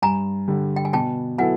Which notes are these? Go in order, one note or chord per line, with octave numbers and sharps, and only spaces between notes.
G2 G#5 A#5
D3 G3
G5
G#5
B2 G5 A5
F#3 B3 E4 A4 F#5 G#5